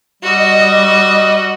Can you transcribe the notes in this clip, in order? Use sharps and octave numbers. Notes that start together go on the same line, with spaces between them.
G3 F#4 D#5